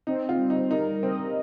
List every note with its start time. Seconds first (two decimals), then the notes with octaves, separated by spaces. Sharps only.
0.07 C4 D#4
0.29 F4
0.39 G3
0.50 D#4
0.71 D#4 A#4
1.03 C4 D#5